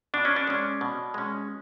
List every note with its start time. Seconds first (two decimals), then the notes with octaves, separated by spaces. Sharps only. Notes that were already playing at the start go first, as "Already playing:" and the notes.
0.14 B2 D4
0.25 C#4
0.36 D4
0.47 G#3 C#4
0.81 B2
1.14 G#3 C#4